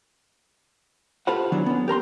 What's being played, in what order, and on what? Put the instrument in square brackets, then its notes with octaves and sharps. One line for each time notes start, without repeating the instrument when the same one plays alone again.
[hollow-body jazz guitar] F4 G4 A4 B4 C5 F#5
D#3 E3 F#3 B3 D4
B3 C#4
G4 A#4 A#5 C6